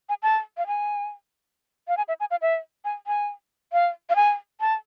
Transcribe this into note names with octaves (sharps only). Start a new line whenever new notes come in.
G#5
A5
F5
G#5
F5
G#5
E5
G#5
F5
E5
G#5
G#5
F5
F5
G#5
A5